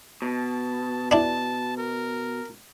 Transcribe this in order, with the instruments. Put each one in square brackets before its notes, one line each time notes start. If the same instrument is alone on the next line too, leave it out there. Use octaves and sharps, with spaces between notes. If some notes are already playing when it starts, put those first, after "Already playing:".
[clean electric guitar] B2 [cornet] A5
[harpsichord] D4 E4 [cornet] A5
[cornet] A#4